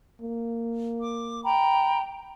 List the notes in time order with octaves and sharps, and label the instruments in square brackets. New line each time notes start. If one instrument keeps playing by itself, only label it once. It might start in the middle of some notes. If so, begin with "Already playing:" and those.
[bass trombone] A#3
[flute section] D6
G5 A#5 B5